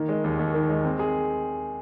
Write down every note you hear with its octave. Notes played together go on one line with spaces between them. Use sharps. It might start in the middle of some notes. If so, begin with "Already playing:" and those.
Already playing: D#3 A#3
G#3
D#2
D#2
D#3
G#3
C4
G#4